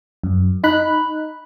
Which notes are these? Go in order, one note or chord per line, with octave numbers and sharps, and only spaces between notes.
F#2
D#4 B5 F#6